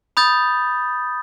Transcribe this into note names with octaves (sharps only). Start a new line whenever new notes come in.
B5 D#6 G6 A6